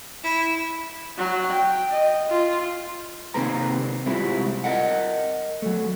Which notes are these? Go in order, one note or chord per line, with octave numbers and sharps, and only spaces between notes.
E4
F#3
G5
D#5
F4
C3 D#3 A#3 C4 B4 A#5
C2 G3 G#3 C4 E4 F4
A#4 D#5 F#5
F#3 A3